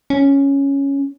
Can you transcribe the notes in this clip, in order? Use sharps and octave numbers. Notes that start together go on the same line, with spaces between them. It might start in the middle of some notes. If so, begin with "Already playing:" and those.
C#4